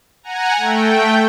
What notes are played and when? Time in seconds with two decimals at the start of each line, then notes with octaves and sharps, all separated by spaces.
0.23 F#5 G#5 A#5
0.56 A3 G5